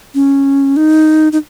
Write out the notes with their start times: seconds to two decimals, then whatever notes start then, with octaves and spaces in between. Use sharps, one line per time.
0.14 C#4
0.76 D#4
1.32 D#4